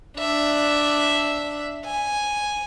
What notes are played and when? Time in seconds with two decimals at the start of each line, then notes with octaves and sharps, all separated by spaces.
0.17 D4 E5
1.85 G#5